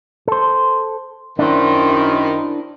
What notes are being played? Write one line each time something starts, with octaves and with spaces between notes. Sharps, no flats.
A4 C5
F#2 D#3 D4 E4 C5